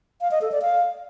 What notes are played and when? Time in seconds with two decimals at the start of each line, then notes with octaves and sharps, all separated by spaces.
0.21 F5
0.31 D#5
0.41 A4
0.52 D5
0.62 F5